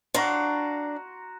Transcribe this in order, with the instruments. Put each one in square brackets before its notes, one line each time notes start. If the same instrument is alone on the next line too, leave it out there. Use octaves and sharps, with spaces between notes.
[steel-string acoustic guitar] D4 D5 F5 [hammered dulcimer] F#4 A#5 C6